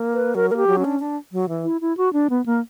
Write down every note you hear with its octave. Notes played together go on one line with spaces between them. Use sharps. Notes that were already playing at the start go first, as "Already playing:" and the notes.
Already playing: A#3
B4
F#3 A#4
A#3 A#4
G4
F#3
C#4
D4
D4
F#3
E3
E4
E4
F#4
D4
B3
A#3